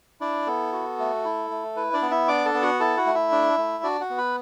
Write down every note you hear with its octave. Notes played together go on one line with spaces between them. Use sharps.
D4 E4 D5
B3 A4
F#4
A3
E4
A3
E4 B4
D4 D5
B3
E4 E5
D4 D5 D6
A4 A5
B3
F#4 F#5
E4 A4 A5
F#4 F#5
A3
E4 E5
D4
A3
D4 F#4 D5
F#4 F#5
B3
B4 B5